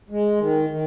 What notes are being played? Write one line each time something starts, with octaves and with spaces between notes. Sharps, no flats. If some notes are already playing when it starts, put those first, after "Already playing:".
G#3
D#3
D#3